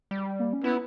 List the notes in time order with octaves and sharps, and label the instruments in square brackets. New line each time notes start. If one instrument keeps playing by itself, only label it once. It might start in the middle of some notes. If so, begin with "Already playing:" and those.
[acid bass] G3
[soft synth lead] A#3
C#4
[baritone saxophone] B3 [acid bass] E4